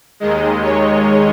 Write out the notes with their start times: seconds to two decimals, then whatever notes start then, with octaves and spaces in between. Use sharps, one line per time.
0.20 D#2 D#3 G#3 D#5
0.62 C#5